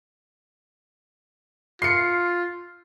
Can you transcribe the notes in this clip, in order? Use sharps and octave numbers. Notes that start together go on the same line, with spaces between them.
F4 C7 C#7